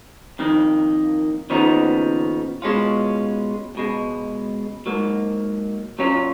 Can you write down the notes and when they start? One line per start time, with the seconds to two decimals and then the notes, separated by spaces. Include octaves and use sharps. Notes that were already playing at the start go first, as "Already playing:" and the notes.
0.39 F2 D#3 A#3
1.50 D#2 C#3 F3 B3 D#4
2.62 B2 G#3 C#4 F4
3.75 C#2 B2 G#3
4.86 G#2 F#3 A#3
5.98 A#2 F#3 C#4 F4